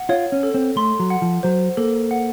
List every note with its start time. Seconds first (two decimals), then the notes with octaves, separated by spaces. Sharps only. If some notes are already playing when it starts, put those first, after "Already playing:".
Already playing: F#5
0.09 F4 C#5
0.32 C#4
0.43 A4
0.54 C4
0.76 A3 C6
1.00 F#3
1.10 F#5
1.22 F3
1.43 F#3 C5
1.77 A#3 A4
2.11 F#5